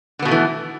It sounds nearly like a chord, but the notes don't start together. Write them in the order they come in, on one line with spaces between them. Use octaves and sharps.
D3 B3 B2 A3 E3